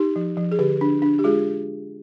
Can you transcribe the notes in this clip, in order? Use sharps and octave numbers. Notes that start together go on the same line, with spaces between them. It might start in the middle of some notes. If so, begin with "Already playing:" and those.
Already playing: D#4 G4
F3
F3
G#4
D3 G4
D4
D4
G4
G#3 F4 G#4